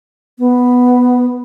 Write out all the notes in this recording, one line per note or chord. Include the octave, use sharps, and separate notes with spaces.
B3